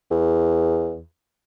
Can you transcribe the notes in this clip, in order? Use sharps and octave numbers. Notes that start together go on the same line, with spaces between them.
E2